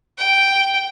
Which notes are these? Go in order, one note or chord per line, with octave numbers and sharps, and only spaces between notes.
G5